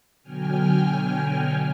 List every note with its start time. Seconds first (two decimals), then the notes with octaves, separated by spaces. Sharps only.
0.23 B2 D3 F#3 G5 G#5 F6